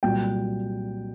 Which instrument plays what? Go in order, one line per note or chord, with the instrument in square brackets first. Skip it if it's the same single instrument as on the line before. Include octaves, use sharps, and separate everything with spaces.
[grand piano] C2 A#2 F#3 G5